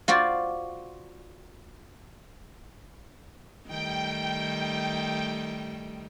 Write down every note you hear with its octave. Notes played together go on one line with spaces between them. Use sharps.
F4 F#4 C5 D5
D#3 G3 A3 G5